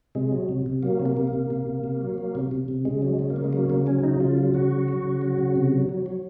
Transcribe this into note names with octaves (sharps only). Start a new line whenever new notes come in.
C3 G#3
F#3
C3
C3
F#3 A#3
C3
A#3
C3
A#3
C3
C3
C3
C3
F#3
F#3
C3
C3
C3
C#3 G#3
F#3
G#3
C#3
A#3
C#3
G#3
F#3 A#3
C#3 A#3
F#3 C#4
C#3 D#4
C#3 F4
F#3
C#3 F#4
F#3
F#3
C#3
F#3
C#3
C3
F#3
F#3
F#3